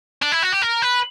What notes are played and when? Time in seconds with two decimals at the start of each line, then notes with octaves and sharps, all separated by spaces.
0.22 D4
0.32 E4
0.43 F#4
0.53 G4
0.62 A#4
0.82 B4